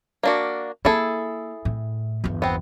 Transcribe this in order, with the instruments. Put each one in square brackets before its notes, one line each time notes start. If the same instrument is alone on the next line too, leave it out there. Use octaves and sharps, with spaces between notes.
[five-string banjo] A#3 D4 F#4
[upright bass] A#3 [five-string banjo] E4 G#4 A4
[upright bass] A2
G1 E2
[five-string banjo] B3 C4